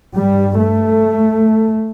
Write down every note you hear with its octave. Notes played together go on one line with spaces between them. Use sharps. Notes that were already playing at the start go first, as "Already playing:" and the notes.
G2 G3
A3